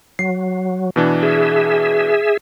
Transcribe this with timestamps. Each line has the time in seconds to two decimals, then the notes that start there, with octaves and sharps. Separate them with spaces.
0.19 F#3 C7
0.96 B2 E3 D4
1.23 G#4 E5